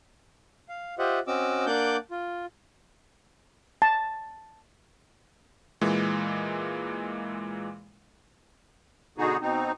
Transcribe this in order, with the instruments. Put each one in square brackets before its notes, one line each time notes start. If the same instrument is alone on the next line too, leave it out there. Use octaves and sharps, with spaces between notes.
[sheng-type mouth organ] F5
F4 G4 C5 D#5 E5 F#5
C4 C#4 F#4 D#5 D6 E6
A#3 D4 D5 F#5 D6 G6
F4
[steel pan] A5
[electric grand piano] A#2 E3 G#3
[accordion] B2 D3 B3 D#4 F#4 G#4
B2 C4 D#4